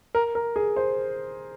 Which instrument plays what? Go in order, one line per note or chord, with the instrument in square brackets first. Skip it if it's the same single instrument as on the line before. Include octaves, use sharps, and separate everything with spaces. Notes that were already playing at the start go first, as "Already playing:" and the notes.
[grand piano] A#4
A#4
G#4
C5